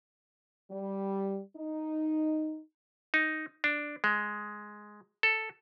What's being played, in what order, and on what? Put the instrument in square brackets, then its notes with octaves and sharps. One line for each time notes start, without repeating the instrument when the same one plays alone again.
[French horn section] G3
D#4
[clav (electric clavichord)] D#4
D4
G#3
A4